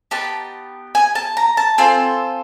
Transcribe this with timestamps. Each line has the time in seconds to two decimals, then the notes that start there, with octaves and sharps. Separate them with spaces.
0.11 B3 D#4 G4 A5
0.95 G#5
1.15 A5
1.37 A#5
1.57 A5
1.78 C4 F4 A4 G#5